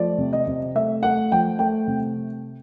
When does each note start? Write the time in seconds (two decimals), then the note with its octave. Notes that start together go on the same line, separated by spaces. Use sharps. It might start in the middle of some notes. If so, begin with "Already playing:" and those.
Already playing: F3 A3 D5
0.18 C3
0.33 D#5
0.47 C3
0.75 A3 E5
1.03 A3 F#5
1.32 F3 G5
1.59 A3 G5
1.87 C3